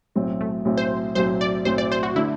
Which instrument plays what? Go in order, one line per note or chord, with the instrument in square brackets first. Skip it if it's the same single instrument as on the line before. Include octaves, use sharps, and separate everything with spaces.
[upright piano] B1 A2 F#3 C4
[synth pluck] A3
[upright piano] B1 A2 F#3 C4
[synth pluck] C5
[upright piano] B1 A2 F#3 C4 [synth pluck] C5
[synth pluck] D5
[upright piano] B1 A2 F#3 C4 [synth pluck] C5
[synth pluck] D5
C5
F#4
[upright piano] D3 A3 D4 [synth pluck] E4